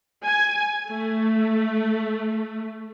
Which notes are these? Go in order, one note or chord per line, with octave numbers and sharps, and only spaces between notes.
G#5
A3